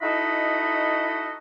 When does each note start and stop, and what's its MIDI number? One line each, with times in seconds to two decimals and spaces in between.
0.02 1.34 63
0.02 1.34 64
0.02 1.34 66
0.02 1.34 69
0.02 1.34 75
0.02 1.34 83